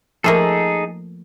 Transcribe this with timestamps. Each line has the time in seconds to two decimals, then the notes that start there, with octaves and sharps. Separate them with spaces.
0.24 F3 A3 A#3 D#4 G#4 A4